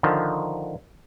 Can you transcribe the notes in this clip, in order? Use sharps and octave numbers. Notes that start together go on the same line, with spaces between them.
D3 D#3 F3